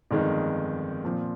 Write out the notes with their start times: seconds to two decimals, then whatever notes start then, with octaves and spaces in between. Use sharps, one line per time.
0.11 G1 F2 D#3 G#3 D#4
1.04 A#2 F3 C4